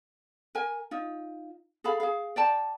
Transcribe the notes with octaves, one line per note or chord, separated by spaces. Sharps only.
A#4 G#5
D#4 F4
G#4 A4 F5 B5
G#4 F5
D5 G5 A5